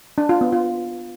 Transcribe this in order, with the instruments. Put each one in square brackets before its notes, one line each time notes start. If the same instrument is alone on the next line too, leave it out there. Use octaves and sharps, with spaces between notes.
[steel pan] D4
F4
B3
F4